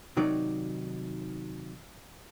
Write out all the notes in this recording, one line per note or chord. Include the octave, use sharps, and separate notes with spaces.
C3 D#3 F#3 D#4 D5